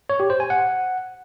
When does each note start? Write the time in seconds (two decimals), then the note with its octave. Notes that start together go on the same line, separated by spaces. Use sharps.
0.10 C#5
0.20 G4
0.30 C5
0.40 G#5
0.50 F#5